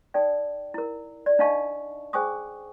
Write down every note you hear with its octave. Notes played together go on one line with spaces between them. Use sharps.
D#4 A4 D5 G5
E4 A#4
D5
D4 D#4 D#5 F5 A5 C#6
G#4 C5 G5 G#5 C#6 D#6